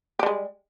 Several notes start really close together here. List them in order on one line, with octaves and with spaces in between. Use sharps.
G4 G3 G#3